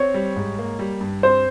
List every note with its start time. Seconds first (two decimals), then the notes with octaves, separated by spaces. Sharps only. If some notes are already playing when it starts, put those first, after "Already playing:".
Already playing: C4 C#5
0.14 G3
0.36 G#2
0.58 A#3
0.79 G3
1.01 G2
1.23 C4 C5